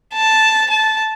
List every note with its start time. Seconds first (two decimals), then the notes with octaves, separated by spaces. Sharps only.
0.14 A5
0.70 A5